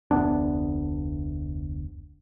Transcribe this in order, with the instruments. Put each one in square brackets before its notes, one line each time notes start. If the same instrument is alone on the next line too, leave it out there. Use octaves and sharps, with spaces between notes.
[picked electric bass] F1 D2 B3 D4